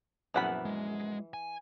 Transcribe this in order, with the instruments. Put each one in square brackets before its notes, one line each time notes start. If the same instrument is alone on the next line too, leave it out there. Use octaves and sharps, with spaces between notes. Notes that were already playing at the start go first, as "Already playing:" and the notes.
[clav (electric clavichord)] A#1 F#2 B3 [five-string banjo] E3 F#5 B5
[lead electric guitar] G#3
G#5